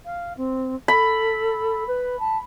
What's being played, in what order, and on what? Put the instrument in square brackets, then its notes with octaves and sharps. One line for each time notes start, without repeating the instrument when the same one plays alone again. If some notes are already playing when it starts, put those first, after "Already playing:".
[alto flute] F5
C4
[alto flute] A4 [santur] B5
[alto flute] B4
A5